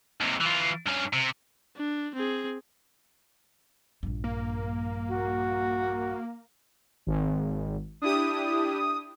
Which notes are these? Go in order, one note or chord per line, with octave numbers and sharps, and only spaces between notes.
D#2 C3
E3 F4
G2 C#4
C3
D4
C4 G#4
A#1 G2
A#3
F#4
G#1
D4 E4 G4 D#6